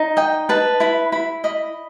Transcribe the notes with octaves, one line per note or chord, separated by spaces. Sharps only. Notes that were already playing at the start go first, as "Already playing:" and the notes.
Already playing: D#4
D#5 G5
B4 A5
E4 B5
E4 B5
D#5 B5